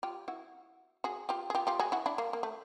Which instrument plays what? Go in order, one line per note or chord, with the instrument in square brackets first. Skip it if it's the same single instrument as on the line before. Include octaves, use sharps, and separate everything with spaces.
[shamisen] F4 G4
E4 F#4
F#4 G#4
F4 G4
G#4
F4 G4
F4 G4
F#4 G#4
E4 F#4
D4 E4
A#3
A#3
A3